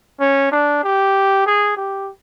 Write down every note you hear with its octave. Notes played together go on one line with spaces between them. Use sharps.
C#4
D4
G4
G#4
G4